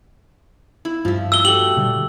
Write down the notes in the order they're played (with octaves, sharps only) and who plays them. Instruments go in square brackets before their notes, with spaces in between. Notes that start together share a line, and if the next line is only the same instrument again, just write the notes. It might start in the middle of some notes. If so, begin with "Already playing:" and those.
[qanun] E4
[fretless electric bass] G2 [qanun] F3 E5
[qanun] E5 [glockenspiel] E6 G7
[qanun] A3 F#4 G4 [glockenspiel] F#7
[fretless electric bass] A#2 D3 G3